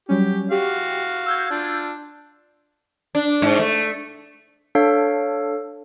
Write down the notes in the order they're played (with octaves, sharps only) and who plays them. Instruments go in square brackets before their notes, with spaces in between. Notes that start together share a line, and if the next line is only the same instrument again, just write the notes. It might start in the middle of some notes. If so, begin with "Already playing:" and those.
[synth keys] F#3 G3 C#4 [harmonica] G4
[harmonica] F#4 F5 [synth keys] G4
[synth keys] E6 G6 G#6
[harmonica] D4 F4
[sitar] D4
G#2
A3
[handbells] D4 A4 C#5 F5